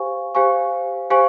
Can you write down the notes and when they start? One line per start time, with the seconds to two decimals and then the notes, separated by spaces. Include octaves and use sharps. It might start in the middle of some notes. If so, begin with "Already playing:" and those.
Already playing: G4 C5 F5 G#5 C#6
0.35 G4 C5 F5 G#5 C#6
1.10 G4 C5 F5 G#5 C#6